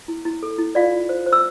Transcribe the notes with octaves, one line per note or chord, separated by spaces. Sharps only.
E4
E4
A4
E4
F4 D5 F5
F4
C5
C5
E6